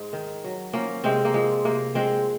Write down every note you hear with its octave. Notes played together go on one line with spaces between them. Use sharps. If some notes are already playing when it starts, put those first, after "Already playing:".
Already playing: G#2 G#3
D#3
F#3
F3 A#3 C#4
C3 G#3 C4
A#3
F3 G#3
C3 A#3
F3 G#3 C4